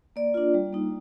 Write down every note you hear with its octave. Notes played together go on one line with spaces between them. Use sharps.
A#3 D5
D4 F4
G3
A#3 D#4